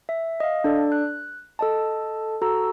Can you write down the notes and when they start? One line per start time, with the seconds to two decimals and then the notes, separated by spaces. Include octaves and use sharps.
0.09 E5
0.40 D#5 F5
0.64 D4 A4 D5
0.92 F#6
1.59 A4 D#5 A5
2.42 F#4 A4 A#5 E6